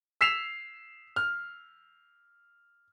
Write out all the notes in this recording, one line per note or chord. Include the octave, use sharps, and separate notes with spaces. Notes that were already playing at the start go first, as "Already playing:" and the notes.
E6 B6 C7 E7 F7
F6